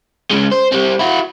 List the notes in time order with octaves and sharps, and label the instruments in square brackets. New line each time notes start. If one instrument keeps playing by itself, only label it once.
[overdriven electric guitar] C#3 G#3
C5
G3 C4
E4 F#4